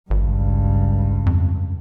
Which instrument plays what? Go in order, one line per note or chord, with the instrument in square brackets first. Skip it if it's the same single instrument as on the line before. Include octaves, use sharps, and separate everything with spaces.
[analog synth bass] G#1 [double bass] C#2 G2
[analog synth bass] F2